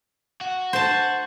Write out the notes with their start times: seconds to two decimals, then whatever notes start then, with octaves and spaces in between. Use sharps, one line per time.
0.41 F#4
0.73 C5 A5